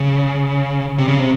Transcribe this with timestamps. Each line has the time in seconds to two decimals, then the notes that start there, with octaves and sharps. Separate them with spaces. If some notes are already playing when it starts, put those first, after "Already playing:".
Already playing: C#3
0.98 C3
1.08 C#3
1.19 C3